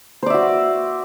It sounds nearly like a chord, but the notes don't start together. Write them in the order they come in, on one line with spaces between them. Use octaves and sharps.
C5 D5 E5 F#4